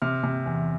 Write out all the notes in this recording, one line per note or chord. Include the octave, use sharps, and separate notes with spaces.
C3 F6
C3
E2